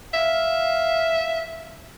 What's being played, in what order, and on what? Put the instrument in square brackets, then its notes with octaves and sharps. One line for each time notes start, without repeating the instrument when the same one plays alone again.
[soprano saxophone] E5 [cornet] F5